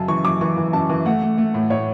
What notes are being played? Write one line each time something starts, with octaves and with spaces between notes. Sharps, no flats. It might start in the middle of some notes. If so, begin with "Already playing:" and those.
Already playing: F#2 C#3 A5
E3 C#6
F#2 D6
E3 C#6
E3
F#2 A5
E3
A3 F#5
A3
A3
A2
A2 C#5